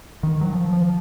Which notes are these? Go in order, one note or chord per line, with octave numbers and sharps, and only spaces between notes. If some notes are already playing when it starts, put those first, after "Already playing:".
D#3
F#3
F3
F3